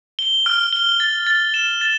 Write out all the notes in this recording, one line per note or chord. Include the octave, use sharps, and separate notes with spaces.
G7
F6
G7
A6
A6
E7
A6